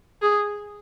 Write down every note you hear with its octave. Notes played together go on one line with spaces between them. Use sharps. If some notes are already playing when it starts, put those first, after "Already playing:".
G#4